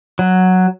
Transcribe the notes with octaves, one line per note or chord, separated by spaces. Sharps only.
F#3